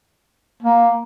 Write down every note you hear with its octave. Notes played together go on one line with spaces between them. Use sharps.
A#3